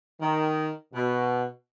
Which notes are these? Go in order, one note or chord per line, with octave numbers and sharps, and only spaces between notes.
D#3
B2